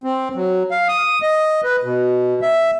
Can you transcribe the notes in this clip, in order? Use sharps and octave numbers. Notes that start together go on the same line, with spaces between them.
C4
F#3
F5
D#6
D#5
B4
B2
E5